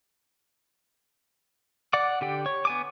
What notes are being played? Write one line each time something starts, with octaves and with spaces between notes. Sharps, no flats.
D5 F#5 D6
D3 G4 G5
C#5
B3 G#5 D6